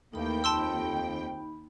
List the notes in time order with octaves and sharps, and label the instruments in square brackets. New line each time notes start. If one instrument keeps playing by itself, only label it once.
[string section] D#2 G5 [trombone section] E3 A3 A#3 [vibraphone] D#4 B5
[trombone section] F2 [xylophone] A5 C6 E6